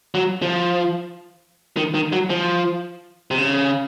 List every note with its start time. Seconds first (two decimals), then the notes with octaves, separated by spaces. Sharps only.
0.14 F#3
0.42 F3
1.77 D#3
1.94 D#3
2.12 F#3
2.30 F3
3.31 C3
3.38 C#3